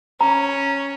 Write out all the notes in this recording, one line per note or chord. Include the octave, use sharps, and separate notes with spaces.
C#4 A#5